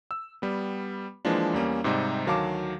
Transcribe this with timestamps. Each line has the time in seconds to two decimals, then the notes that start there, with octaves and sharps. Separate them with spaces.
0.11 E6
0.42 G3 B3
1.25 E3 F3 G#3 A#3 D4
1.53 E2 G3 A#3 C#4
1.84 G#2 C3 G3 D#4
2.26 D2 D#3 F#3 F5 A5 D6